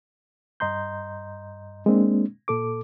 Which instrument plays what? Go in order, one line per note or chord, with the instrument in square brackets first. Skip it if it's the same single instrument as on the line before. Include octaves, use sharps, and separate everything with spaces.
[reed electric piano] G2 D#5 A#5 C6 G6
G#3 A#3 C4 D4
A#2 A4 D6